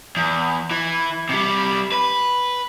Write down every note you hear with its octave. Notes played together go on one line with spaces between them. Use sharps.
E2
E3
C3 G3
B4